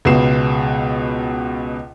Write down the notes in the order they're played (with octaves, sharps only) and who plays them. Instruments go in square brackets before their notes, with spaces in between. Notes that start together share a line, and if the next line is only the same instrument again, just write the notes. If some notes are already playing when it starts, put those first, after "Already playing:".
[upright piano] C#2 B2 B4 C7 E7